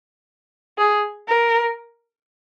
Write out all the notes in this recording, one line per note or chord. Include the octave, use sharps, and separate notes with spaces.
G#4
A#4